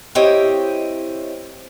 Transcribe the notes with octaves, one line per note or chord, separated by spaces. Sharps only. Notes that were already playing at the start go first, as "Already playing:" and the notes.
C4 E4 G4 C#5 D#5 G5